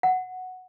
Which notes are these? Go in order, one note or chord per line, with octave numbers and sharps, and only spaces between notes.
F#5